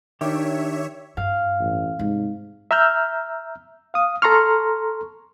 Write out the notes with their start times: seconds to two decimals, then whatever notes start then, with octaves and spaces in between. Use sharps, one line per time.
0.21 D#3 D4 G4 C#5 E5
1.17 G2 F5
1.60 A1
1.99 G#2 C3 G3
2.71 E5 A#5 E6 F6 G6
3.94 F5 D#6
4.22 A4 A#5 C6 C#6 F6